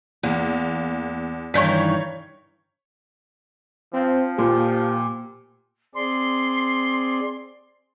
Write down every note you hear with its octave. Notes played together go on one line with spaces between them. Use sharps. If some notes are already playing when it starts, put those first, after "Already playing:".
E2 A#3
G2 D#3 E3 C#5 G6 B6
F3 C4
A#2 G4
C4 G#4 D5 C6